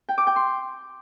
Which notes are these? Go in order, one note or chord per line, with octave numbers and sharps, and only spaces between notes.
G5
D6
G5
C6